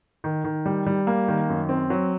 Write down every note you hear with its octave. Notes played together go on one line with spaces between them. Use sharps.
D#3
D#3
G3
G3
A#3
D#3
F#2
C4
F#3